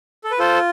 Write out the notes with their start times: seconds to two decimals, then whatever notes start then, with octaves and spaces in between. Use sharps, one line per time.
0.24 A4
0.31 B4
0.39 F4 A4 C5